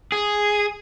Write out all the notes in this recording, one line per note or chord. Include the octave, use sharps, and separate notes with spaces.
G#4